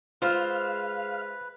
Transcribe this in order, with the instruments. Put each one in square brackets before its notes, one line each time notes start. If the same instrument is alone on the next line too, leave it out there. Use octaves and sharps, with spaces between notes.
[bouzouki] G#3 C5 E5 [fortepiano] F4 F6 [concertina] B4 [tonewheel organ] F5